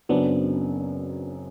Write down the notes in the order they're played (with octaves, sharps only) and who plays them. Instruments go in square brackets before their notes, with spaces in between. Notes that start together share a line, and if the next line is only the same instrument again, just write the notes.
[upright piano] F#1 F#2 F#3 C4 [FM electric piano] B3 D4